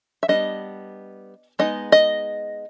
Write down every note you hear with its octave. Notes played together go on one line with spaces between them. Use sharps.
E5
G3 B3 D4 D#5
G#3 B3 D#4 D#5
D#5